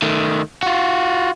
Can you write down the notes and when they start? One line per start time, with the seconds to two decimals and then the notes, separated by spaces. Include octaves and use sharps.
0.02 D#3 A3
0.63 F4 F#4